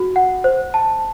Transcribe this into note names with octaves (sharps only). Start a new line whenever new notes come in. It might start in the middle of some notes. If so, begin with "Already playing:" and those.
Already playing: F#4
F#5
C5
A5